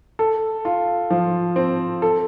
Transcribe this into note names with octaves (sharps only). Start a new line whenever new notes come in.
A4
F4
F3
C4
A4